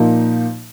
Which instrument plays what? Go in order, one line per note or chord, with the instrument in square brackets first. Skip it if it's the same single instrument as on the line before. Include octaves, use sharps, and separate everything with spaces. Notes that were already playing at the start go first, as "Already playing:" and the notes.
Already playing: [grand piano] A#2 F3 A#3 D#4